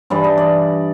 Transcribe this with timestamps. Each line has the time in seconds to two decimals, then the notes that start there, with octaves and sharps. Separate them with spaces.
0.10 G2 E3 G3 D5
0.24 D#5
0.38 D5